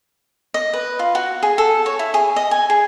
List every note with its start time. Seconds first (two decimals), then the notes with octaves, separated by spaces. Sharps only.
0.54 D#5
0.73 B4
0.99 F4
1.15 F#4
1.43 G#4
1.58 A4
1.86 C#5
1.99 E4
2.14 G#4
2.36 D#5
2.51 G#5
2.70 G#4